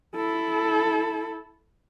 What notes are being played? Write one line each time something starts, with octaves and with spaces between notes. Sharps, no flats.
E4 A4